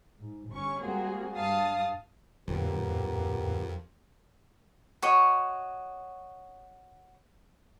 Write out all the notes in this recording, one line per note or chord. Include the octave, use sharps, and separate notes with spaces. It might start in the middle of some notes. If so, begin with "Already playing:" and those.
G#2
G1 C#4 C#6
G3 G#3 A#3 C4 F#4 G#4
G2 F5 A5 D#6
D1 F2 A#2 D3 B3 G4 A#4
F#4 C#5 D#5